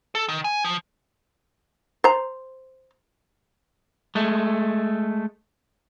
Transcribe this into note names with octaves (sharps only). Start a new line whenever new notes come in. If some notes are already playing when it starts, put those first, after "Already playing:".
A4
D#3
G#5
F3
C5 A#5
G#3 A3